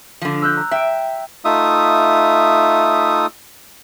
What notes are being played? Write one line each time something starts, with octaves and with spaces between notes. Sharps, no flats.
D3 F3
E6 F#6 G6
A#5
E5 G5 D7
A3 D#4 F4 E5 D#6